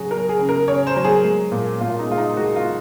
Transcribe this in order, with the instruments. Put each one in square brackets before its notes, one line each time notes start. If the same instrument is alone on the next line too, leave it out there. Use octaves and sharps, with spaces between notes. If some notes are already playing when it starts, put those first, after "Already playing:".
Already playing: [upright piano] C#3 F#3 F#4 G#4
F#3 A#4
G#4
C#3
A#4
C#3 C#5
C5
F#3
G#4
G#3
A#2
A#2 F4
D#4
G#3 F4
D#4
G#3 F#4
F4